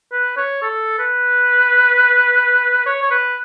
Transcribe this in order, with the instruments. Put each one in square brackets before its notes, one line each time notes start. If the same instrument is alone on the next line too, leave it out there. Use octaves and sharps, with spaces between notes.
[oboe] B4
C#5
A4
B4
C#5
C#5
B4